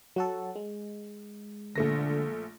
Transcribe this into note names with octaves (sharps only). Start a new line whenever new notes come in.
F#3 F#4 A4
G#3
A#1 D3 A3 A#6